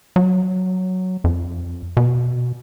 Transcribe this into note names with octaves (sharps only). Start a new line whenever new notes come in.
F#3
F2
B2